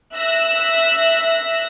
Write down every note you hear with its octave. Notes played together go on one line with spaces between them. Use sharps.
E5 E6 F#6 A#6